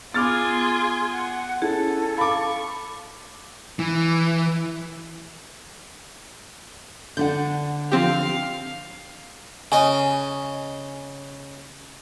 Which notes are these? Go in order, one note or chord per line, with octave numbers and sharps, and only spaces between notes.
B3 F4 G#4 G#5 D6 F6 A6
F#5
C#4 E4 G#4 A4
F5 B5 C#6 D6
E3
D3 D4 F#5 G6
F3 C4 G4 F5
C#3 D#5 G#5